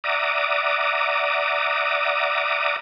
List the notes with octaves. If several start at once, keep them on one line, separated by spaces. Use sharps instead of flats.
D5 E5 F#5 A#5 D6 D#6